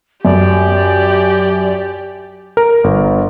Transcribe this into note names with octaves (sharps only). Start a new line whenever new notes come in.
F#2 G4 D5
A#4
G1